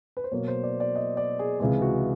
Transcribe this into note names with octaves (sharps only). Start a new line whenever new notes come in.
B4
C5
B2 F#3 A#3 C#5
C5
D5
D5
D#5
D5
G#4
C#2 C3 E3 G#3 G#4
F#4